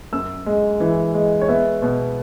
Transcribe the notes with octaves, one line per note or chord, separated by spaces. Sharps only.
F#2 E6
G#3
E3
G#3
C#5
B3 E5
B2